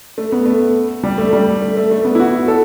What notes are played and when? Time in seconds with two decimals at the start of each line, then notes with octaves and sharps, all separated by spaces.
0.18 A3
0.32 B3
0.46 A3
1.03 G3
1.18 A3
1.33 G3
1.62 A3
1.77 A3
1.91 A3
2.05 B3
2.15 E4
2.20 F#4
2.48 A4